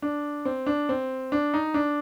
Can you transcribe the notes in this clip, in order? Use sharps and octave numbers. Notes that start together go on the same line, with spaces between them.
D4
C4
D4
C4
D4
D#4
D4